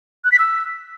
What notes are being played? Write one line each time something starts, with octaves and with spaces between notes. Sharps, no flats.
F#6
B6
E6